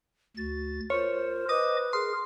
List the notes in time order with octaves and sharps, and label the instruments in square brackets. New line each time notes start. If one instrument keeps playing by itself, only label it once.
[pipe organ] D2 A6 [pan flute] F#4
[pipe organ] F4 A#4 [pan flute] C5 [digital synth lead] C#5
[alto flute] B4 [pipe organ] D#5 D6 [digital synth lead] D#6
[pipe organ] G#4 A#4 [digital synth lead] C6